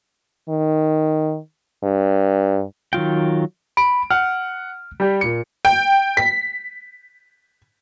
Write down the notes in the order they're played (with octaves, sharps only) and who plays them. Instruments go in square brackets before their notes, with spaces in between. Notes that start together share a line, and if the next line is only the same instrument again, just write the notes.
[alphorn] D#3
G2
[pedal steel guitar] D#3 F#3 F4 G5
[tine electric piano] B5 [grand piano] D7
[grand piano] F#5 [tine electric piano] F6
[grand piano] G3 G4
A#2 C#7
[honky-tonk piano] G5
B6